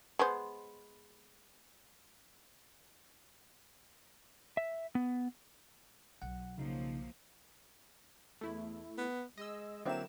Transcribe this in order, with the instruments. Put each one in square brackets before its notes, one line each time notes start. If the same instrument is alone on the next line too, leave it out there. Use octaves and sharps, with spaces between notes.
[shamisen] G#3 B3 C5
[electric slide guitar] E5
B3
[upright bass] B1 [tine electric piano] F#5
[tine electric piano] C#3 D#4 [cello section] F3 F#3 A#3
[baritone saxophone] E2 [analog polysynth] A3 E4
[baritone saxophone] B3
[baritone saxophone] G#3 [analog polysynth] D#5 E6
[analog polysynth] D3 E7 [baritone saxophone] F#3 [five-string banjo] A#3 C4 E4